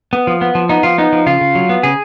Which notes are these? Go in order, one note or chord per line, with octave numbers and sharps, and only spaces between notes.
B3
F3
B3
F3
B3 D#4
F3 F4
B3 D#4
F3
C#3 F4
C#3
F#3
B3
C#3 G#4